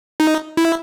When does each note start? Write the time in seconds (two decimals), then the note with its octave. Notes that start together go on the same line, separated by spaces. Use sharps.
0.20 D#4
0.57 E4